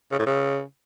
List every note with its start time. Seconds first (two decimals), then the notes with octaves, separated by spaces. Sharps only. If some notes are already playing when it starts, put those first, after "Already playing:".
0.12 C#3
0.19 A2
0.26 C#3